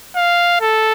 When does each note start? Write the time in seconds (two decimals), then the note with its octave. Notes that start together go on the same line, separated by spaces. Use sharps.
0.16 F5
0.61 A4